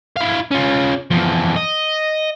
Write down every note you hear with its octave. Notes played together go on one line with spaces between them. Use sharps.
E4 F5
C#4 F4
E2 F3
D#5